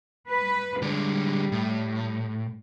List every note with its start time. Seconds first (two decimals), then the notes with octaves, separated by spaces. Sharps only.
0.30 B4
0.82 D3 G3 G#3
1.52 A2